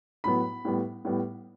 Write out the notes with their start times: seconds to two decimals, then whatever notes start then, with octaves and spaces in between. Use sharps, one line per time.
0.24 A2 F#3 B3 B5
0.65 A2 G3 B3
1.05 A2 G3 B3